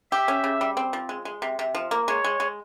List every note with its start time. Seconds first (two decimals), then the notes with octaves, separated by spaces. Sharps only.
0.11 G4 E5
0.28 C#4
0.44 C#3
0.61 G3
0.77 C4
0.93 F3
1.09 G#3
1.25 G#3
1.42 C3
1.59 C3
1.75 F3
1.91 A#3
2.08 G#3 C#5
2.24 G#3
2.40 G#3